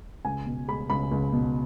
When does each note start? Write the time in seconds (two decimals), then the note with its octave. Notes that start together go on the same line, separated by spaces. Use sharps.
0.25 C#2 G#5
0.46 B2
0.68 G#3 B5
0.90 C#2 B5
1.12 C#2
1.33 B2